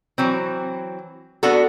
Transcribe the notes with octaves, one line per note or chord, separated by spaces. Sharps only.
E3 F#3 C4
B3 D4 F#4 A4